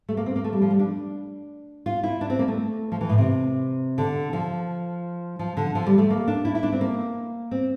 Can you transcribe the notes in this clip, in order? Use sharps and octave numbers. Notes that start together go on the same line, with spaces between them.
A3
A#3
C4
A#3
A3
G3
F3
G3
D4
F4
E4
D4
C4
A#3
A3
F3
E3
A2
C3
D3
F3
F3
D3
F3
G3
A3
A#3
D4
E4
E4
D4
C4
A#3
C4